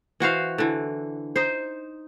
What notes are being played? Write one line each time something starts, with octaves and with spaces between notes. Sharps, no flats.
E3 F#4 C5 F5
D3 E3
D#4 C5